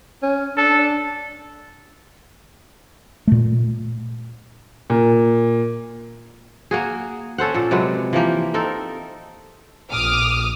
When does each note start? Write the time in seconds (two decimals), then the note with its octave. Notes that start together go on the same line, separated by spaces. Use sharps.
0.23 C#4
0.57 D4 A4
3.28 A#2 A3
4.90 A#2
6.71 A#3 F#4 G#4
7.38 C#4 A4 C5 F#5
7.54 A#2 A4
7.71 C3 F#3 G#3 B4
8.13 E3 F3 A#3 G4
8.54 C4 D#4 A4 A#4
9.92 A#1 D6 D#6 F6